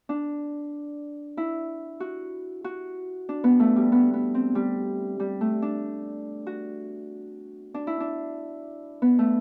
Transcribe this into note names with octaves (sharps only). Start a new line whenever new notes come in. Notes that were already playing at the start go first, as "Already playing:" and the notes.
D4
E4
F#4
F#4
D4
B3
A3
G3
B3
B3
C4
G3
G3
A3
D4
F#4
D4
E4
D4
B3
A3